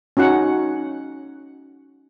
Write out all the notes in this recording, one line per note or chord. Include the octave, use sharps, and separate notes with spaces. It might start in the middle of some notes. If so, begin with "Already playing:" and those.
C#4 D#4 F#4 F#5